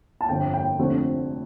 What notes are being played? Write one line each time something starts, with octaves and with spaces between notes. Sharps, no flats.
A5
G1 F2 D3 G5
G5
F1 F2 D3 A3 C4